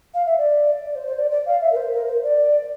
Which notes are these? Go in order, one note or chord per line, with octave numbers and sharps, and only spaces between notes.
F5
E5
D5
D5
C5
C5
D5
D5
F5
E5
A#4
C5
A#4
C5
D5